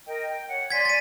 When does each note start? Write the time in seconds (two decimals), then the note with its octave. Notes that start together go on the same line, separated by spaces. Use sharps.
0.07 A#4 D#5 G5
0.29 G5
0.49 C#5 F#5
0.70 D5 G#5 C6 G#6 B6
0.85 D5 A6 D#7